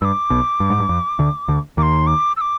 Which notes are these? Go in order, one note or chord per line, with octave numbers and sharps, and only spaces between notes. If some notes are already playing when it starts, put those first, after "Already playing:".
G2 D6 E6
B1 B2
G2
G#2
G2
F2
D2 D3
D2 D3
D#2 D#3 D6
C6
D6
E6
D6